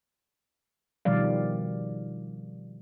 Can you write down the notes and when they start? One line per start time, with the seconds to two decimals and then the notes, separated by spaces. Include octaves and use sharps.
1.05 B2 D#3 F3 G3 D5 F5